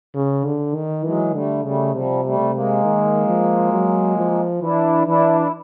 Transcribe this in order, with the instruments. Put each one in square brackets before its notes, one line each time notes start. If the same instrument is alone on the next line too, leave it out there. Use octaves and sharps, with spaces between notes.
[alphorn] C#3
D3
D#3
[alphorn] E3 [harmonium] F#3 G#3
[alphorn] D3 [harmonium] G3 A3
[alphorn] C#3 [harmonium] G3 A3
[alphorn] C3 [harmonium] F3 G3
[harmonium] G3 A3
[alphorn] C3
[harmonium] G#3 A#3
[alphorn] D#3
F3
F#3
F3
[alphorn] E3 [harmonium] D4 E4
[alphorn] E3 [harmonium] D4 E4
[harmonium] E4